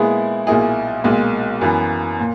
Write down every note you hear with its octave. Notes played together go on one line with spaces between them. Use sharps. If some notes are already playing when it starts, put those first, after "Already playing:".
Already playing: A#2 G#3 B3 E4 G#4
B1 A#2 A#3 E4 G#4
B1 A#2 G#3
F#2 E3 B3
A#2